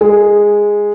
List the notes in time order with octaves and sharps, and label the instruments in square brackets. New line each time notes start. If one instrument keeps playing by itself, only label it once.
[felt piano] G#3